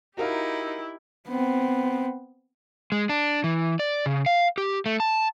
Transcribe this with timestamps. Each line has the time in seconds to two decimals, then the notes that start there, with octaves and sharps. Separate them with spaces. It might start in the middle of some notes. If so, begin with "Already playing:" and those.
0.17 D#4 E4 F#4 G4 A#4 F5
1.29 B3 C4
2.92 G#3
3.09 D4
3.44 E3
3.79 D5
4.06 C#3
4.26 F5
4.58 G4
4.86 A3
5.00 A5